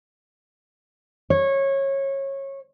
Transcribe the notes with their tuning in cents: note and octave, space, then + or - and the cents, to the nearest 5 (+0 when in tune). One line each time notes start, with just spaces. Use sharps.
C#5 -20